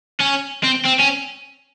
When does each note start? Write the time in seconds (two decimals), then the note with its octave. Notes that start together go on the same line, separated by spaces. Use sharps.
0.21 C#4
0.64 C4
0.85 C4
1.00 C#4